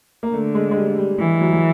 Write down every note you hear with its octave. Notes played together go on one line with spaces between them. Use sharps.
A#3
D3 A3
G#3
G#3
G3
G3
E3 G3
F#3
F#3